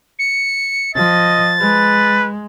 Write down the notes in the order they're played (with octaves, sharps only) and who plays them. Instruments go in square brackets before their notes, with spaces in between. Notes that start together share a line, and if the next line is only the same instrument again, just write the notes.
[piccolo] C#7
[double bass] F3 [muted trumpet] D#5 [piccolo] A6
[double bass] G#3 [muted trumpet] B4